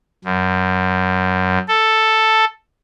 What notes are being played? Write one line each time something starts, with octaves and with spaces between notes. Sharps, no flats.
F#2
A4